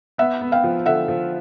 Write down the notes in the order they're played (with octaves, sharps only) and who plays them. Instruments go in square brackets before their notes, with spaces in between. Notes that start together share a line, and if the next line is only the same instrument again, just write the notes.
[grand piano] B3 [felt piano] E5 F#5
[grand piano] B3
[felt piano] F5 G5
[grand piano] F3
[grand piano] D3 [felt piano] E5 F#5
[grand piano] F3